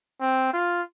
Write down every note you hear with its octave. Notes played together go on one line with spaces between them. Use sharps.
C4
F4